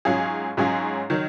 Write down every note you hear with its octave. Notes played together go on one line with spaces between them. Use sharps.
G#2 F#3 C#4 F4 G#4
G#2 F#3 C#4 F4 G#4
D#3 F#3